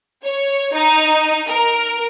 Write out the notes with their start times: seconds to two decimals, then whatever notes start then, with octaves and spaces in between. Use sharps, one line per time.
0.23 C#5
0.74 D#4
1.48 A#4